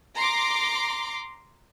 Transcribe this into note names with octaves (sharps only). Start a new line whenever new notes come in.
A#5 C6 D6